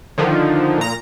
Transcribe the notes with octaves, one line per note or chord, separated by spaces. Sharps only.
D3 D#3 F3
A#2 A#5